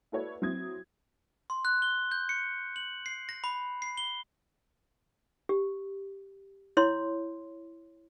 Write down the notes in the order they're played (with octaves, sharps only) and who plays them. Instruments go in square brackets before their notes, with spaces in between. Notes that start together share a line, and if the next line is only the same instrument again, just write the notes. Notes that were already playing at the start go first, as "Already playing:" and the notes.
[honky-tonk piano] E4 F#4 A4 B4 C#5 D5
F#3 C4 E4 D#6 G#6
[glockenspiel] C6
F#6
G7
G6
C#7
F#7
C7
A#6
B5
C7
G7
[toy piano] G4
E4 C#5 C6